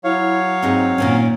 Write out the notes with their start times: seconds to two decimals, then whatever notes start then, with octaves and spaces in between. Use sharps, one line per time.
0.04 F#3 E4 C#5 F5
0.62 G#2 C4 D#4 G#4
0.98 A#2 D#3 C#4